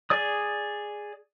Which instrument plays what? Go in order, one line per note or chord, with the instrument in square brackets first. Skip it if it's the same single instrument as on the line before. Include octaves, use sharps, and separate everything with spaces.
[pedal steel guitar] G#4 D5 D#6